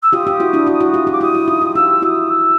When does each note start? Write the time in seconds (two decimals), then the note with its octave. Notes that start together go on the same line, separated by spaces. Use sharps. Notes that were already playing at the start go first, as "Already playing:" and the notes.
0.02 E6
0.13 F4 G4 D#6
0.27 F4 G4
0.40 E4 F#4
0.53 D4 E4
0.67 E4 F#4
0.80 E4 F#4
0.94 F4 G4
1.07 F4 G4
1.12 D6
1.20 E4 F#4 D#6
1.35 E4 F#4
1.48 D#4 F4
1.62 F4 G4
1.75 F4 G4 E6
2.02 E4 F#4 D#6 E6
2.29 E6